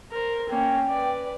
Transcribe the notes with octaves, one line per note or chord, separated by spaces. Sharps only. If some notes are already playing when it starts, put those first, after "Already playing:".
A#4 C5
A#3 C#4 G5
B4 D5